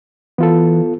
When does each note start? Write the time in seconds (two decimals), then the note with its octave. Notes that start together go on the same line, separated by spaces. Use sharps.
0.38 E3 B3 F4 A4